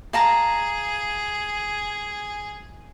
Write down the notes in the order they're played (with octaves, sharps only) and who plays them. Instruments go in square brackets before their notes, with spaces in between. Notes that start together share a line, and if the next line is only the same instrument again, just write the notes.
[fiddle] G#4 [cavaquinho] F5 A5 A#5